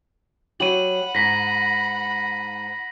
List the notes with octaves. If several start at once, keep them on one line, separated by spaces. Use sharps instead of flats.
F#3 F#4 G4 F#5 B5 D#7 F#7
G#2 A#6 B6